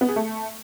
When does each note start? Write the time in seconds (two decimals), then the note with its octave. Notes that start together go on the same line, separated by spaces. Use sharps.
0.01 B3
0.09 G#4
0.16 A3